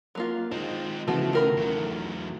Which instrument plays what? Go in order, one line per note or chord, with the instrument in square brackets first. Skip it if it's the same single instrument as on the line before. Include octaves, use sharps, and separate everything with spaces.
[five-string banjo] F#3 A#3 F4
[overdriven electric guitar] G#3 C4 [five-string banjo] D#4 [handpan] F4
[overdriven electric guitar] C#3 [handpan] E3 A3 [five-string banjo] F3 B3 F#4
[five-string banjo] D#3 A#4 B5
[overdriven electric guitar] E2 F#3